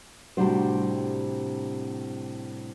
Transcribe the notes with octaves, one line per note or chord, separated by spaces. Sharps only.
A2 C3 G3 D4 F#4 C5